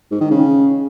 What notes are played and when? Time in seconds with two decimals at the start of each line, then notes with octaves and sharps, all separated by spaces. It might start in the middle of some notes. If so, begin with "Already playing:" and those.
0.11 G#2
0.21 D#3
0.30 C#3